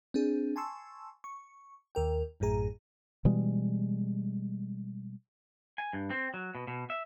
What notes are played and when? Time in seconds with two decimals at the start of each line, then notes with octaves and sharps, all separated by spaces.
0.14 C4 D4 G#4
0.56 G#5 A5 C6 C#6 E6
1.24 C#6
1.95 D#2 A#4 G5
2.40 A1 F#2 A2 G#4 A#5
3.25 B2 E3 G3 G#3
5.78 G#5
5.93 G2
6.10 C4
6.34 F#3
6.55 B2
6.67 B2
6.90 E5